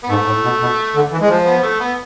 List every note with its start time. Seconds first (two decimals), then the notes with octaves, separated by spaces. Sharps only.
0.03 B3
0.09 G#2 A3
0.26 A2
0.43 B2
0.61 B2
0.95 D3
1.12 E3
1.21 G#3
1.29 F3
1.46 B3
1.63 A3
1.80 B3